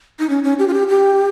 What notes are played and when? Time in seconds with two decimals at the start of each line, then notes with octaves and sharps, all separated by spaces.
0.19 D#4
0.29 C#4
0.43 C#4
0.59 G4
0.68 F4
0.73 G4
0.88 G4